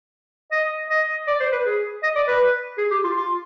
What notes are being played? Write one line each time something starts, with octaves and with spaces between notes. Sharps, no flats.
D#5
D#5
D5
C5
B4
G#4
D#5
D5
B4
G#4
G4
F4
F4